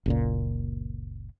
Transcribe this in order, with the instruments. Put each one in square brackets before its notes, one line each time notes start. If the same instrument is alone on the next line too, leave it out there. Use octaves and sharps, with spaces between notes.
[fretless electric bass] F#1 C#2 A#2